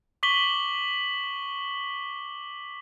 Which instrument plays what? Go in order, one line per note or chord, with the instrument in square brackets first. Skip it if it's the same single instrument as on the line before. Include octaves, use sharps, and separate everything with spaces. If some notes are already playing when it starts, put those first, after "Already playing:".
[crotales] C#6 D6 B6 F#7 G7